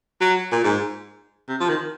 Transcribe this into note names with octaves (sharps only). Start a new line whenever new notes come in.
F#3
A#2
G#2
C3
F3
D#3